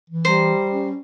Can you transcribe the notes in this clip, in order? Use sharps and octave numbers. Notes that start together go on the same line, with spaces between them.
E3
G3 C5 A#5
C#4